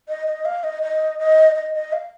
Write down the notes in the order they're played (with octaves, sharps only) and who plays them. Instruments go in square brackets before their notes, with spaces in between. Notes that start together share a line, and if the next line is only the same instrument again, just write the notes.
[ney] D#5
D#5
F5
D#5
D#5
D#5
D#5
D#5
F5